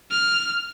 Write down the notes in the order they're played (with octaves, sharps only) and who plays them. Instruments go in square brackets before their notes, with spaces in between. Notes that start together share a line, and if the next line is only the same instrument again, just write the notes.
[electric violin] F6